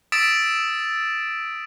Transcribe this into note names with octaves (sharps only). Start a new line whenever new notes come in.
D#6 E6 A6 B6 D7 E7